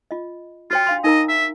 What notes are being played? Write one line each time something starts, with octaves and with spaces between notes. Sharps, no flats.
F4 D#5
F4 F#4 C#5 G5
D4 F5 C6
D#4 A#4 D#5 A#5
E5